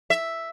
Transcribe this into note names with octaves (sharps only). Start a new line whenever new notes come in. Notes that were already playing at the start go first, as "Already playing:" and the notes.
E5